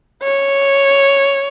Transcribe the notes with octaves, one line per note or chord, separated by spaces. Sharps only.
C#5